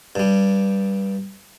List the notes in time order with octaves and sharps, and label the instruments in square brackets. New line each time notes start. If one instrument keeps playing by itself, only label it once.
[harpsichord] G2 G3